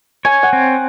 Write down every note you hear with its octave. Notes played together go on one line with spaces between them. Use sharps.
C#5 G#5
F#5
C4